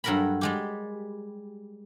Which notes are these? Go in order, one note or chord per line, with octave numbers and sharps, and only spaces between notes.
G2 F#3 A4 A#4 A#5 B5
G3 G#3 G4